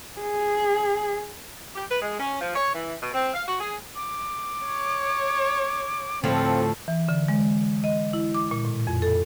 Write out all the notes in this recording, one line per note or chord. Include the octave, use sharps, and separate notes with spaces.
G#4
G4
B4
G#3
C#4
F3
C#5
E3
B2
C4
F5
F#4
G#4
D6
C#5
D2 A2 F3 C4 A4
E3
D3
G#3
D#5
E4
D6
A#2
A2
F2
A4